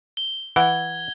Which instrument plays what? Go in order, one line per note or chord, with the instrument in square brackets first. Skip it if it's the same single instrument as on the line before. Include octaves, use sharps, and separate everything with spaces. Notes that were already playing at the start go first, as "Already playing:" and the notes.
[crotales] G7
[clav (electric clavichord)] E3 [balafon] F#5 [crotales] G#6 G7